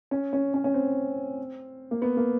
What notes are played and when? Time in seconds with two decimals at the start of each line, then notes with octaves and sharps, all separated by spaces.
0.11 C#4
0.33 C#4
0.54 C#4
0.64 C#4
0.74 C4
1.91 A#3
2.02 B3
2.17 A#3